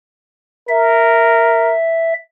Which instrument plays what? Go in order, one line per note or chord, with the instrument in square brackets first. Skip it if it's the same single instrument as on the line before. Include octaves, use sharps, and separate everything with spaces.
[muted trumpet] A#4 [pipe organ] E5